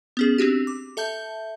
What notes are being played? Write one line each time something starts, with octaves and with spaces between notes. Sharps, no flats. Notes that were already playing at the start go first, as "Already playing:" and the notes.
B3 C#4 G#4
C4 D4 F#4 G4
D6
A4 E5 A5 G6